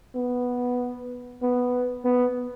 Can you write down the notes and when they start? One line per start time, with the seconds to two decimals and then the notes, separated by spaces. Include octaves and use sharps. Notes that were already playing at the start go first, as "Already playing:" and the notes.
0.15 B3
1.42 B3
2.05 B3